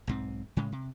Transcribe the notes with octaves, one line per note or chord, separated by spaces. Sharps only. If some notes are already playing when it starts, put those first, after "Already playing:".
B1 G#2 C4
A2 C#3 G#3
C3